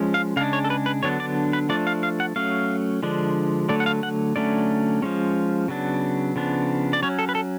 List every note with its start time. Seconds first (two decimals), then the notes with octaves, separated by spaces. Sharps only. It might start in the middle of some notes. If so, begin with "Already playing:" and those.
Already playing: F3 G#3 C#4
0.14 F5
0.36 C#3 G#3 D4 F5
0.53 C#5
0.65 A4
0.70 B4
0.86 B4
1.03 D3 F#3 B3 D4 C#5
1.20 D5
1.53 B4
1.69 F3 A3 D4 D5
1.87 F5
2.03 F5
2.20 F#5
2.36 F#3 A3 C#4 F5
3.03 D3 F3 G#3 D4
3.69 D3 F#3 A3 D5
3.80 F#5
3.86 F5
4.03 F#5
4.36 D3 F#3 A3 C#4 D5
5.02 F3 G#3 C#4
5.68 C#3 F#3 B3 D4
6.36 C#3 F3 B3 D4
6.93 D5
7.03 F#3 C#4 C#5
7.19 A4
7.29 B4
7.35 A4